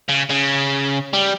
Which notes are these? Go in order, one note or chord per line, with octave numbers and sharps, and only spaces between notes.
C#3
C#3
G3